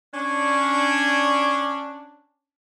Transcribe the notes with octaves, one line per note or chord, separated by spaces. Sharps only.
C#4 D4